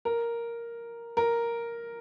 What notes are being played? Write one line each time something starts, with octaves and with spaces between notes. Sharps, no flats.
A#4
A#4